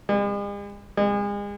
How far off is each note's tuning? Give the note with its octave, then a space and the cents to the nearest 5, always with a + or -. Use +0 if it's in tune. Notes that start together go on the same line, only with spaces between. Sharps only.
G#3 -45
G#3 -35